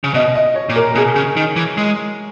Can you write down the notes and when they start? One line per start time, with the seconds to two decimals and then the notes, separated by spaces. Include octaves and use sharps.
0.04 C#3
0.14 B2 D#5
0.35 D#5
0.55 C#5
0.69 A#2
0.76 A#4
0.95 B2 G#4
1.16 C#3
1.36 D#3
1.56 E3
1.78 G#3